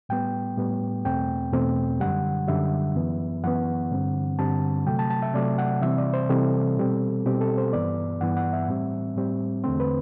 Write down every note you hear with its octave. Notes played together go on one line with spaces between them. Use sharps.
A2 G3 B3 G5
A2 G3 B3
E2 B2 A3 C4 G5
E2 B2 A3 C4
F#2 D3 G3 F#5
F#2 D3 G3 E5
F#2 E3 B3
F#2 E3 B3 F#5
G2 D3 G3 C4
G2 D3 G3 C4 A5
C3 F#3 A3 G5
A5
A5
E5
C3 F#3 A3 D5
F#5
C3 E3 G3 C4 E5
D5
C5
C3 E3 G3 C4 A4
B2 G3 C4
B2 G3 C4 G4
A4
C5
G2 E3 B3 D5
G2 E3 B3 F#5
F#5
E5
A2 G3 C4
A2 G3 C4
E2 D3 A3 C4 C5
B4